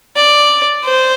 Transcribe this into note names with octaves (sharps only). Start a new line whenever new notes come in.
D5
C5